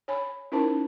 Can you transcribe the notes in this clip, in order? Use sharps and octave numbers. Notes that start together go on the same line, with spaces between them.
C#5 G#5 B5
C#4 D#4 E4 A#4 C5 A5